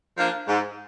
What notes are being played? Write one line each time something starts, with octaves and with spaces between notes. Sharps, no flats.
F3 A#3 D4
G#2